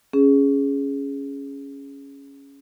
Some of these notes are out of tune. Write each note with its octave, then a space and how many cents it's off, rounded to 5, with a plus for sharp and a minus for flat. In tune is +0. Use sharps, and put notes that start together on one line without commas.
C#4 +0 G#4 +0